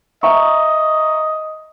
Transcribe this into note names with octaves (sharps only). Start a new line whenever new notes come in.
D#5 E5 A#5 C#6